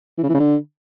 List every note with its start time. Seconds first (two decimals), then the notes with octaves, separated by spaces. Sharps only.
0.18 E3
0.23 C#3
0.29 E3
0.34 C#3
0.40 D3